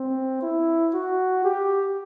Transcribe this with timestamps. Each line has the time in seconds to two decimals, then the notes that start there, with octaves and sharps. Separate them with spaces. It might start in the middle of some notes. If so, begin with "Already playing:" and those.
Already playing: C4
0.42 E4
0.94 F#4
1.45 G4